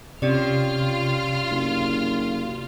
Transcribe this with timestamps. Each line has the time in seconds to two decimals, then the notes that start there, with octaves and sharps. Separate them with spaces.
0.22 C3 C#4 F4 G4 D5 F6
1.51 F#1